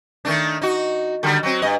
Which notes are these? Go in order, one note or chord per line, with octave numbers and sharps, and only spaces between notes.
D#3 A3 D4
D#4 F#4
D3 D#3 G3
F#3 C4
G2 D#5